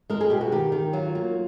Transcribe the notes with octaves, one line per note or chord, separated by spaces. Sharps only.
G#3 A#4
G#4
B2 G4
F#4
D#3 G4
D#3
F#3 F4
A#3